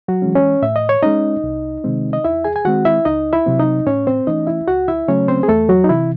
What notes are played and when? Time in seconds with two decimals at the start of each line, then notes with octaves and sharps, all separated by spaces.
0.08 F#3 F#4
0.22 E3 G#3 C#4
0.35 C#4 C#5
0.62 A2 E5
0.76 D#5
0.89 C#5
1.03 G#3 C#4 D#4 D#5
1.44 C2
1.84 C3 D#3 G#3 C4
2.13 D#5
2.25 E2 E4 E5
2.44 G#4 G#5
2.56 G#5
2.65 D#3 G#3 C4 F#4 F#5
2.85 E4 E5
3.05 C#2 D#4 D#5
3.33 E4 E5
3.46 C3 F#3 C4
3.60 D#4 D#5
3.86 A2 C#4 C#5
4.07 C4 C5
4.27 E3 A3 C#4 D#4 D#5
4.47 E4 E5
4.67 C#2 F#4 F#5
4.88 E4 E5
5.08 C#3 F#3 A3 C#4 C#5
5.28 C4 C5
5.43 G#4
5.49 E2 A3 A4
5.69 F#3 F#4
5.84 D#4
5.89 C3 E3 E4